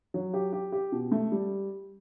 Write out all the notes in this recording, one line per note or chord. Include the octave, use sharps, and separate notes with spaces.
F#3
G4
G4
G4
B2
A3
G3